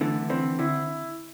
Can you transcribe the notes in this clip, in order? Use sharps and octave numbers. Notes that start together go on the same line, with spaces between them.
D3 E3 A3
E3 C4
D3 E4